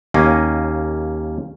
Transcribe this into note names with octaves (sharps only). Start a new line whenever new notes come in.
D#2 A#3 C#4 D#5